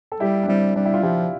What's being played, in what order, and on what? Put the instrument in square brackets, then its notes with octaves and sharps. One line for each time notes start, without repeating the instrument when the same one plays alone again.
[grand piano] A4
[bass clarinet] G3 [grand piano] E4 G4
[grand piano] D4
[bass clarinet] G3 [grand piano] C4 E4
[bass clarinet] G3 [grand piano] D4
[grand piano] E4
F4
[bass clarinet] F3 [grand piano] E4 G4